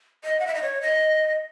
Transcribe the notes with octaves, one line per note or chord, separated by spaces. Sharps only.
D#5
F#5
E5
D#5
C#5
D#5